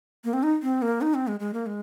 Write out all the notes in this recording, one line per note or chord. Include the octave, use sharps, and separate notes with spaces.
A#3
C4
D#4
C4
A#3
D#4
C4
G#3
G#3
A#3
G#3